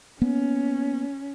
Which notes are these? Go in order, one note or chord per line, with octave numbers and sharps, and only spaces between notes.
A#3 B3 C#4